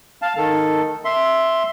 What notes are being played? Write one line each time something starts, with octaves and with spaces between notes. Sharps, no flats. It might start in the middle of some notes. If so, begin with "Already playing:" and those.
F5 A5
D#3 A4
E5 C6